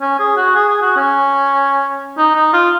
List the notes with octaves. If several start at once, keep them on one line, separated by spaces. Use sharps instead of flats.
C#4
G#4
F#4
G#4
G#4
F#4
C#4
D#4
D#4
F4